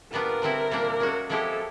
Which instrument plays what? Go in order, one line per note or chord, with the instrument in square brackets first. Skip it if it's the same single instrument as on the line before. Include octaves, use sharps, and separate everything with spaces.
[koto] A#2 G3 B3 D4 F4 [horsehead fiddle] A#4
[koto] D3 G3 C4 E4
A#2 G3 A#3 D4
G#3 C#4 F#4
[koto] F3 G#3 C4 E4 G4 [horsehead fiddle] A4